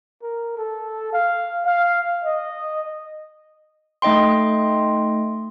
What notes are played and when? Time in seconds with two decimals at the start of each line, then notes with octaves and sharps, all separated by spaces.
0.23 A#4
0.57 A4
1.13 F5
1.66 F5
2.25 D#5
4.02 A3 D#4 D#5 G5 C6